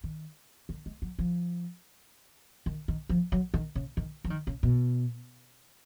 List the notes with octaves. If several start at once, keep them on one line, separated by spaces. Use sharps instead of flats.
D#3
D#3
G#3
F#3
F3
D#3
D#3
F3
F#3
D#3
C#3
D#3
F3
D#3
C#3
B2